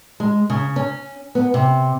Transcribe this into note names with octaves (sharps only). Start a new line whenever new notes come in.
G#3
C#3
C#4
B3
C3